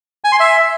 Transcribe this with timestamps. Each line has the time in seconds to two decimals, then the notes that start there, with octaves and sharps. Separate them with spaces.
0.24 G#5
0.32 C6
0.40 E5